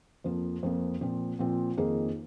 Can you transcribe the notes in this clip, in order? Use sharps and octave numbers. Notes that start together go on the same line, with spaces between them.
F2 F3 A#3
F2 F3 A#3
A#2 F3 C4
A#2 F3 C4
F2 D#3 A#3 D#4 G#4